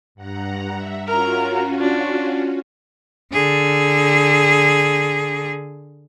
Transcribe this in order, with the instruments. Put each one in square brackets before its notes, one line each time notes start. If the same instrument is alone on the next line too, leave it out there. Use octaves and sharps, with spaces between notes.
[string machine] G2 F#5 A#5
E5
[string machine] C#4 F4 F#4 [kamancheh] A#4 A#5
[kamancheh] D4
[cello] D3 G#4